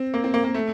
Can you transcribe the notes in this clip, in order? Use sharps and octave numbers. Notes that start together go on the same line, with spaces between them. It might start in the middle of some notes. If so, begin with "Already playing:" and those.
Already playing: C4
A#3
C4
A#3
A#3
A3